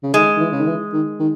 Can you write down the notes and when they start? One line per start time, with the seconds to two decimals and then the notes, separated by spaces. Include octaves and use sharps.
0.03 C#3
0.14 D#3 G#3
0.37 D#3
0.40 E3
0.52 C#3
0.59 D#3
0.67 E3
0.93 D#3
1.20 D#3